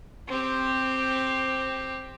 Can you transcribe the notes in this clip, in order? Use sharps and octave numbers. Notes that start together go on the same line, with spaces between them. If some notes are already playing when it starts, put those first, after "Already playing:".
C4 G4